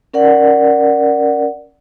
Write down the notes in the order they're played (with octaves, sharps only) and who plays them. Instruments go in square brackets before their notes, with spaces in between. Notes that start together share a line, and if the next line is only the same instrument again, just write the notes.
[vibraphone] C#4 A#4 D5 F#5